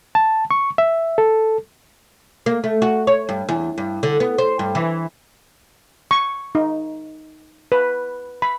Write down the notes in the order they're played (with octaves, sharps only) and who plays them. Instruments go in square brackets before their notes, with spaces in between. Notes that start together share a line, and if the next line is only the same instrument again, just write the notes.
[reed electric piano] A5
C#6
E5
A4
[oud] A#3
A3
F#4
C#5
G2
E2
G2
D3
B3
C5
G2
E3
[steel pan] C#6
D#4
B4
B5